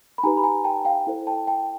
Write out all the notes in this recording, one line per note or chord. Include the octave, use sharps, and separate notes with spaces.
B5
D#4 G4 B4 G#5 A#5
B5
G#5 A#5
G5 A5
F5 G5
E4 A4 C5
G5 A5
G5 A5